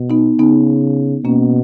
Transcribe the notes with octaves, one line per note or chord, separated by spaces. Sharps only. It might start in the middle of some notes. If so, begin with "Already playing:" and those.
Already playing: B2
B3 D#4
C#3 B3 D#4
B2 A#3 C#4